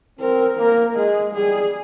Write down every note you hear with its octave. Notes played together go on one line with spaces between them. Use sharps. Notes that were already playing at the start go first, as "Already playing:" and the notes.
C4 A#4
A#3 A#4
G#3 G#4
G3 G#4